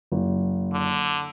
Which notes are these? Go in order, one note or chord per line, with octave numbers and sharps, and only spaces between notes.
F#1
D3